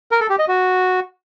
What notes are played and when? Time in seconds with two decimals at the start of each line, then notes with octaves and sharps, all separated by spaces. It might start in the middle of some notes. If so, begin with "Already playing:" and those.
0.11 A#4
0.21 A4
0.30 G4
0.39 D#5
0.48 F#4